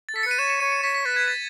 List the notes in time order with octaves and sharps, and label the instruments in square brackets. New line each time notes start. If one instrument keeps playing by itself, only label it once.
[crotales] A6
[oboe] A4 [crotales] B6
[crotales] C#7
[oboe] B4 [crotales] D#7
[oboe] C#5 [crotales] E7
[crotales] E7
[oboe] C#5 [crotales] D#7
[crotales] C#7
[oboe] C#5 [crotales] B6
[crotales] B6
[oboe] B4 [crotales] A6
[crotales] G#6
A6